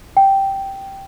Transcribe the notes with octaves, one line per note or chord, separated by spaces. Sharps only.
G5